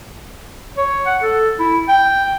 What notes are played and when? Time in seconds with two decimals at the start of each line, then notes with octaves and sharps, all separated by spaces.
0.77 C#5
1.06 F#5
1.22 A4
1.59 E4
1.88 G5